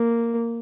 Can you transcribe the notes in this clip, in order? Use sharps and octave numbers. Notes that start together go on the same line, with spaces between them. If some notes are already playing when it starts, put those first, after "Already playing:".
Already playing: A#3